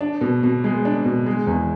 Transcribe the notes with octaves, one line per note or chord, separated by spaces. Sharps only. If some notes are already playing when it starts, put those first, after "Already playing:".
D4
B2
B2
G#3
D4
B2
G#3
E2